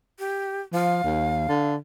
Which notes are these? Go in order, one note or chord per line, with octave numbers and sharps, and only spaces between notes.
G4
F3 F5
D#2
D3